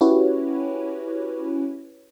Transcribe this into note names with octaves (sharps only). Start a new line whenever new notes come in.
C#4 E4 F#4 G4 B4 C#5